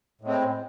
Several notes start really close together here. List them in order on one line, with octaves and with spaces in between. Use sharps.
A2 G#3 C4